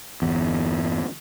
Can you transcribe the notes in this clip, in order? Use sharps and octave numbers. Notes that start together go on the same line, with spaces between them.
G1 E2